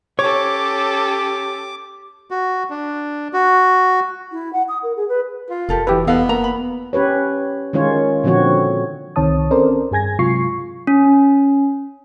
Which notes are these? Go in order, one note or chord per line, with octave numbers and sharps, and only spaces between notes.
C#4 G4 A4 C#5 D6
F#4
D4
F#4
E4
F#5
D#6
A#4
G#4
B4
F4
F1 G4 A4 A#4
E3 E4 F#4 G4 B4
E2 B3 A4 D#5 F5
A#3 A#5
B5
C#4 G4 B4 C#5
D#3 G#3 C#4 F4 C#5
A#2 D3 F3 C4 F#4 C#5
C2 D#3 C4 C#5 A5 D#6
C4 C#4 A4 A#4 C5 D5
G2 G#4 G#5 G#6 A#6
C3 F#3 G#3 F4 C#6 C7
C#4